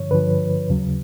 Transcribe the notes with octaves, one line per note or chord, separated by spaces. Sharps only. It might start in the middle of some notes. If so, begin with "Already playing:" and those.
Already playing: G2 D3 F3 C#5
G2 D3 F3 B4
D#2 C#3 F#3